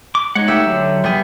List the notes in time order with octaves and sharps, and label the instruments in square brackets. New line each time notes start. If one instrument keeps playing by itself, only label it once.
[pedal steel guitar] D6
[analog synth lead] G#3 [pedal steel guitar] D#4 C#5 F#5
[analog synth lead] A3 [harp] G4 E5
[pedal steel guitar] D3 [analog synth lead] F#3
[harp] G3 G#4 [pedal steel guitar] B3